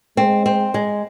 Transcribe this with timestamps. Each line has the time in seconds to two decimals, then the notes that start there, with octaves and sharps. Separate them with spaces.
0.17 G#3 C4
0.46 C4
0.74 G#3